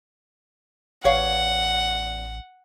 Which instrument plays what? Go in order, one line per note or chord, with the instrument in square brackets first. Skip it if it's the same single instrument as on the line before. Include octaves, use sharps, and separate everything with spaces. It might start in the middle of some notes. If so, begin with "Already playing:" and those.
[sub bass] A1 [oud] E2 C#5 F5 [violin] F#5